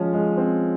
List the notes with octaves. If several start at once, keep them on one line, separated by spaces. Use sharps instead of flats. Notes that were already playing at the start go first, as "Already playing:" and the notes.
Already playing: F3 G#3 C#4
G#3
C4